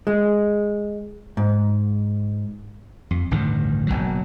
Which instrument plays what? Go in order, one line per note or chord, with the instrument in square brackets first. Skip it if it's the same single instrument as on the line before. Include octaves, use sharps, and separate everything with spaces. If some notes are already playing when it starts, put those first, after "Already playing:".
[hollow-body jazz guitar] G#3
G#2
[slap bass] F2
A1 D2 G2 D#3
F#1 B1 B2 F#3